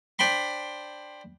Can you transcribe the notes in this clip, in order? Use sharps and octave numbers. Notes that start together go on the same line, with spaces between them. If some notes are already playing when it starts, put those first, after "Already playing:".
D4 C5 G5 B5 C6